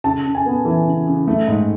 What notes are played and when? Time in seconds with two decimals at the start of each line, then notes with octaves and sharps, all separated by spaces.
0.04 C#3 A5
0.25 C#3
0.35 G#5
0.46 B3
0.65 E3
0.86 C#3
1.07 C#3
1.28 A3
1.48 G#2